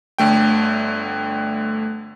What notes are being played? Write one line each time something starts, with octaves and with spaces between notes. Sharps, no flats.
G1 D3 A3 G5